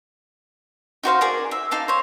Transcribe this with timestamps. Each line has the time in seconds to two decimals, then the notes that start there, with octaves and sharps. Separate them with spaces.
1.03 D#4 F#4 C5 F5
1.21 G#4 A#4 D5
1.51 E5
1.71 D#4 F5 A5 D6
1.88 C5 C#5